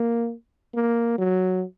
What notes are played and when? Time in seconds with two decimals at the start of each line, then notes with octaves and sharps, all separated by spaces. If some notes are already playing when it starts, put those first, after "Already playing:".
Already playing: A#3
0.74 A#3
1.18 F#3